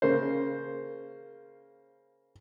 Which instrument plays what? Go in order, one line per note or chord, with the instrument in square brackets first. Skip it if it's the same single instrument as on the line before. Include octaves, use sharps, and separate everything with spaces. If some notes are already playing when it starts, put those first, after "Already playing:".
[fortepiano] C#3 A#3 C5